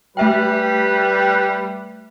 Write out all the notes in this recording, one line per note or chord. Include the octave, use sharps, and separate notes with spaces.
G3 A3 B4 E5 G5